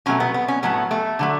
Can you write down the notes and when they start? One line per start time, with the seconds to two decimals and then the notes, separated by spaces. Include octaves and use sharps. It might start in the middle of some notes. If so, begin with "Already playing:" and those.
0.06 B2 F#3 A3 C#4
0.20 B3
0.34 B3
0.48 C#4
0.63 A2 F#3 A3 B3
0.91 A3
1.19 D3 F#3 A3